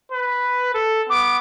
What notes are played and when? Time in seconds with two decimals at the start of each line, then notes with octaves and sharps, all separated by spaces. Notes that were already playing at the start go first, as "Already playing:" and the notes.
0.12 B4
0.74 A4
1.09 B3 D6